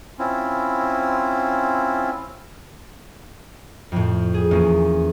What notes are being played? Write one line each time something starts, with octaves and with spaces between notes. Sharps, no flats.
C4 C#4 E4 F4
F2 A2
G#4
E2 A#3 C#4